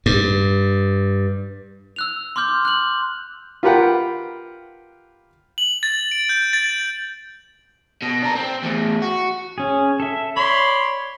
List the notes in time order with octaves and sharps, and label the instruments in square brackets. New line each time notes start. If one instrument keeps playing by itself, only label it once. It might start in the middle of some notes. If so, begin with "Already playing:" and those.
[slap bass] G2
[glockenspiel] E6 F#6 F7
C6 D6 F6 G6
C6
F#6 F#7
[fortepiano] F4 G4 A#4 B4 F#5 G5
[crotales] F#7
A6
D7
G6
A6
[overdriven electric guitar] B2
D4 A#4
C4
E2 A2
F#4
[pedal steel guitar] C#4 G#4
A4 E5
[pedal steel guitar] C#5 [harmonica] D5 B5 C6